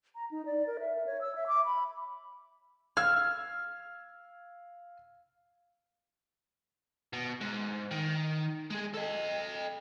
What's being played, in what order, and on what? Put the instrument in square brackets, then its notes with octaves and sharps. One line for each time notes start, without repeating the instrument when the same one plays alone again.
[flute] A#5
D#4
D5
A#4
E5
C#5
E6
E5
D6
B5
[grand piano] F5 E6 G#6 [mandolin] F6
[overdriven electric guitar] B2
G#2
D#3
G#3 G#4
A4 D#5